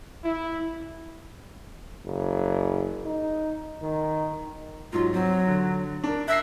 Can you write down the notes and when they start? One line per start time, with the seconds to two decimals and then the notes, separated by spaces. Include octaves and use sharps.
0.24 E4
2.05 F#1
3.05 D#4
3.82 D#3
4.93 G#2 F#3 F4
5.13 F#3 C4
5.47 D3
6.04 D4 A#4
6.28 E5 F#6 A#6 C7